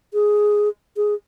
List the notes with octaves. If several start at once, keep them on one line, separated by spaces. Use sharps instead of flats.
G#4
G#4